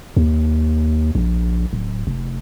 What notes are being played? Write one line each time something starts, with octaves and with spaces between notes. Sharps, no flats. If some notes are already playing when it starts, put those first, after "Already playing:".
D#2
A#1
D1
F1